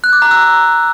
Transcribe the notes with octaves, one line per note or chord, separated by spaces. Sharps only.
F#6
D6
A#5
E6